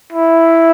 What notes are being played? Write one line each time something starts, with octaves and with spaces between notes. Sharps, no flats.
E4